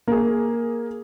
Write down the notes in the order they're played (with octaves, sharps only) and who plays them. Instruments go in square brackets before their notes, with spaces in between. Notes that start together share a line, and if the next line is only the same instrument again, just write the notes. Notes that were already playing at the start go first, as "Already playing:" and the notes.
[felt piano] A#3 G#4